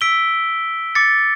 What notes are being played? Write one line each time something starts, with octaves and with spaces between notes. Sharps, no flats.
E6 B6 D7 G7
D6 A6 C#7